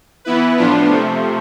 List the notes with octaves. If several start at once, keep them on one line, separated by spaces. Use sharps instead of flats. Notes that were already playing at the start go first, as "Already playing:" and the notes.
E3 B3 E4 B4
A2 F3 B3 D4 F4
C3 F3 A3